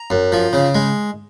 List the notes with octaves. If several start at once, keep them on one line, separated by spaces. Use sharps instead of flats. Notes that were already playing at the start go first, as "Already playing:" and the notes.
Already playing: A#5
F#2
F3
C#3
G#3